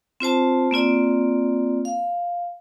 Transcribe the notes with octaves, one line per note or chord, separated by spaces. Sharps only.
C4 F4 C5 A5
A#3 C4 F4 D5
F5